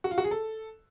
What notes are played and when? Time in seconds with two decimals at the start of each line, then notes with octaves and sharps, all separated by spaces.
0.04 F#4
0.11 F4
0.18 F#4
0.24 G#4
0.31 A4